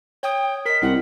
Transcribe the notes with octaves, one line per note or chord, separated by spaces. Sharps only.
C#5 G5 D#6
A#4 D#5 B6
C2 F#5